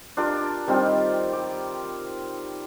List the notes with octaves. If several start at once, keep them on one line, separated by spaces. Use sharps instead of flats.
D4 F4 G4 A#4
D#3 G3 C4 F4
G4